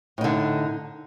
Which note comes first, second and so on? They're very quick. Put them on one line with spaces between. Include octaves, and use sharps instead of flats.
A2 D#4 D3